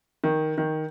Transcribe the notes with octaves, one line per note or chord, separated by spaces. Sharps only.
D#3
D#3